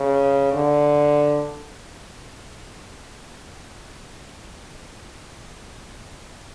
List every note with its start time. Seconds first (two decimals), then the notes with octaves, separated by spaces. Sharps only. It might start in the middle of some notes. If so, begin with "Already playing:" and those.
Already playing: C#3
0.53 D3